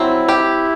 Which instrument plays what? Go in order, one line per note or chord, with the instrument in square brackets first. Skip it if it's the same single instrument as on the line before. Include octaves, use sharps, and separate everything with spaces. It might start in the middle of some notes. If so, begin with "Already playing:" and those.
Already playing: [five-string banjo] F#3 C4 [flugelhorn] E4
[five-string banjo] G4